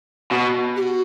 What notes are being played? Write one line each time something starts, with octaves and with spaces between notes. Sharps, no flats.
B2
G4
F#4